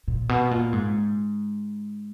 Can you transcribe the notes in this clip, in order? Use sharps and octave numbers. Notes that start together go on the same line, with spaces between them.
A#2
B2
A#2
G#2